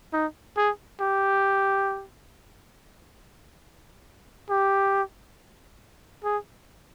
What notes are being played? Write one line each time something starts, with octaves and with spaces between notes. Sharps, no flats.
D#4
G#4
G4
G4
G#4